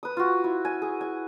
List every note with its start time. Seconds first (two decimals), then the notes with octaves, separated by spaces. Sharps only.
0.03 B4 D#6
0.17 F4 F#4
0.44 E4
0.65 G#5
0.82 G#4
1.01 G#5